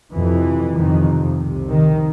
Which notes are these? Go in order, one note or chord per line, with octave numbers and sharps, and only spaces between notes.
F2 C3 E3
F2 C3 D#3
C2 C3
D#3